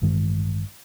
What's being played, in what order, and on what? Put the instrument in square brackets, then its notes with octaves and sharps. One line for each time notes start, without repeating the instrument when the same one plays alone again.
[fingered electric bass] A1 G2 D#3 G#3